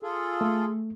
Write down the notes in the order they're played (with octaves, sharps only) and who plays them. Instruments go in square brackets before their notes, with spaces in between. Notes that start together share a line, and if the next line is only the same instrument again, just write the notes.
[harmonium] F4 G#4 A4
[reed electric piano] A3